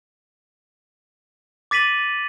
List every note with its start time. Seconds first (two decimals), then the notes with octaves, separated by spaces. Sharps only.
1.71 D6 A6 B6 D#7 F#7